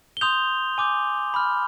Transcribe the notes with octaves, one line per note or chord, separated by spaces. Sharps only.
G7
C6 D#6 G6 F7
G#5 D6 G6
B5 F6